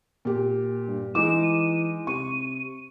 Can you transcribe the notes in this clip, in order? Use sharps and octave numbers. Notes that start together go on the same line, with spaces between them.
A#2 G4
G2
E3 G#3 D#4 D6 E7
D#7
C3 C#6 D#7